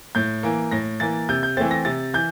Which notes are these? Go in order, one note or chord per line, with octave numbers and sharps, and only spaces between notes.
A2 G6
E3 A#3
A2 A#6
E3 A#3 A6
C3 G6
G6
E3 A3 C4 A6
A#6
C3 A6
E3 G6